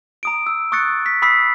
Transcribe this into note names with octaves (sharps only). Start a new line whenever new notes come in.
A#5 D#6 D7
E6
C#6 D#6 F#6 A6 C#7
B6
B5 D#6 E6 B6 C7